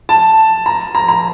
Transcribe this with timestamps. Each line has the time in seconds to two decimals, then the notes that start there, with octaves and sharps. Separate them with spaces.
0.09 A5
0.66 A#5
0.95 A#5
1.08 A#5